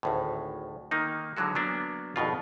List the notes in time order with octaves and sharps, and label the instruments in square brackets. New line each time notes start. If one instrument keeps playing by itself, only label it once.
[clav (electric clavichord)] G#1 D2 A2
D#3 A#3 D#4
D3 E3 F#3 G#3 F#4
F#3 A#3 B3 D4
G#1 F2 B2 F4